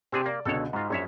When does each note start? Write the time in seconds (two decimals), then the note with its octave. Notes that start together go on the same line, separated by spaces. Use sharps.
0.12 C3 C4 D4 G4 G#4 C6
0.26 A#3 D5
0.45 C#2 B2 D3 A4 C#5
0.73 G#2 F4 F#4
0.90 A#1 F#2 C#5 E5